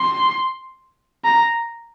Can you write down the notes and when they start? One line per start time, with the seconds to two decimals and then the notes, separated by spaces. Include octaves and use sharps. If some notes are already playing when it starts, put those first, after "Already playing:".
Already playing: C6
1.25 A#5